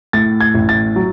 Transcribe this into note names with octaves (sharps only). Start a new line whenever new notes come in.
A2 A6
G#6
A1
A6
F#3